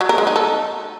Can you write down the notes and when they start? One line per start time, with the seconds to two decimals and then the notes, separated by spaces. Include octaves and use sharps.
0.01 F#3
0.09 A#4
0.18 G#3
0.27 D#4
0.36 A4